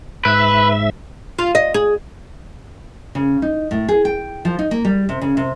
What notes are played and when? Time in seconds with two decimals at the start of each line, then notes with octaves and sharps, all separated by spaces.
0.25 G#2 B4 E5
1.39 F4
1.55 D#5
1.74 G#4
3.15 C#3
3.42 D#4
3.71 A2
3.88 G#4
4.05 G5
4.45 F3
4.59 D#4
4.71 A#3
4.85 G3
5.09 C3
5.21 C#3
5.37 C3